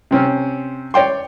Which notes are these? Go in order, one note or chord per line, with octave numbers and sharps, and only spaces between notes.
C3 C4 C#4
C#5 D5 G5 C6